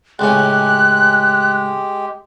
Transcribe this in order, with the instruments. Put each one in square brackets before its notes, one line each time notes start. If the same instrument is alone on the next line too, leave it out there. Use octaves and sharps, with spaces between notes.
[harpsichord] C#2 A2 C#4 [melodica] G#3 G4 [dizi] F#6